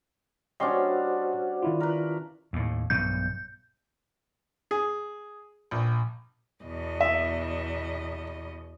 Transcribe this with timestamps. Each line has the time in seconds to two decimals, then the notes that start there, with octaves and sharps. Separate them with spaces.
0.60 G3 C#4 D4 F#4 C5 D#5 F#5 C6
1.62 D#3 E4 F4
1.80 A#4 B4
2.53 D#2 A2
2.90 B1 G2 B2 G6
4.71 G#4
5.71 A#1
6.63 E2 B2 D#5
7.01 E5